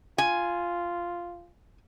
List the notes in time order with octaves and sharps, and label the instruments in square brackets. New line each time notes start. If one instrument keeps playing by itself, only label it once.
[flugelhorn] F4 [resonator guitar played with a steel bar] G#5